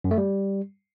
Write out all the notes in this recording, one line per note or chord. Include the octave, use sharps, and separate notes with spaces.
F#2
A3
G3